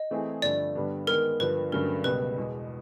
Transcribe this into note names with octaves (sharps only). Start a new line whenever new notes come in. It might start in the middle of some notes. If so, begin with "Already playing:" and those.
Already playing: D#5
E3 A3 C4 E4 G#4
G2 D3 F3 A3 D5
G2 D3 G3 B3 D4
D#3 G#3 B3 A#4
G2 D3 F3 B4
G2 D3 F#3 A3 C#4 A#4
C#2 B2 G3 B4
E2 B2 G#3